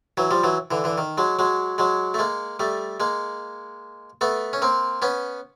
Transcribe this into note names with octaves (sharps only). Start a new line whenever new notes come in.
E3 F#3
F3 G3
E3 F#3
D3 E3
D3 E3
D#3
F#3 G#3
F#3 G#3
F#3 G#3
A3
G#3 A#3
G3 A3
G#3 A#3
A3 B3
C#4
A#3 C4
B3 C#4